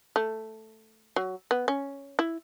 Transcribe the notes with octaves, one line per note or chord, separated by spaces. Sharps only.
A3
F#3
B3
C#4
E4